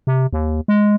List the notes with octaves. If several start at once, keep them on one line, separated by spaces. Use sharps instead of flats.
C3
D#2
G#3